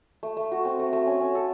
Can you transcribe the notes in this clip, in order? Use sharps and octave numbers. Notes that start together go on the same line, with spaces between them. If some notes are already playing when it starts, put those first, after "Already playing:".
A3
A3
F#4
C4
A3
A3
C#4
C#4
A4